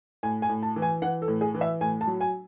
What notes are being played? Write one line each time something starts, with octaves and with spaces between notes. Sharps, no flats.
A2 G#5
G#5
A2
A5
E3
G#5
E3 F#5
A4
A2
G#4
E3
E5
A2 G#5
A5
F#3
G#5